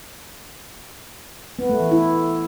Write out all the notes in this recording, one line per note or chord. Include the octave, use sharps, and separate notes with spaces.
B3
A3
E3
E4